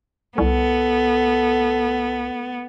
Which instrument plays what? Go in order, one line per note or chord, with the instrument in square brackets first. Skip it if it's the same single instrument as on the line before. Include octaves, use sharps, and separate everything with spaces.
[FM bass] C2 [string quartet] B3 [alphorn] A4